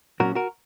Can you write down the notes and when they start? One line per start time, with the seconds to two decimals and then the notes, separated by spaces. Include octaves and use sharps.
0.20 A#2 F#3 A#3 C#4 F#4 A#4
0.35 F#4 A#4